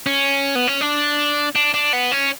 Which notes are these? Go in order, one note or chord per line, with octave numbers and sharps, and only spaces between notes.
C#4
B3
C#4
D4
D4
D4
B3
C#4